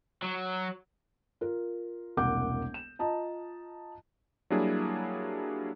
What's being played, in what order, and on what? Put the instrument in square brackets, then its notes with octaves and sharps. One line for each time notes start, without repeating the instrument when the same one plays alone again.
[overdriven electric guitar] F#3
[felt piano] F4 A#4
E1 C2 A#3 F#5 D6 G6
E7
F4 D#5 A5 A#5
[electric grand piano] F#3 G3 A#3 D4 E4 G#4